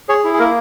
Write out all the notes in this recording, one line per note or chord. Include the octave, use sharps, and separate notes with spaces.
G#4 C#5
E4
G#4
A#3 A#4